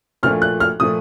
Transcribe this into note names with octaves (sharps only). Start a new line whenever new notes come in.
A#1 A#2 F3 A3 F6
F#6
F6
A#2 F3 A3 D#6